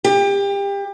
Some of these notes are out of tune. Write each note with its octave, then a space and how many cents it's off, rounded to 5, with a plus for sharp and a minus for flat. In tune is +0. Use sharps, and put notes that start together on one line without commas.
G4 +30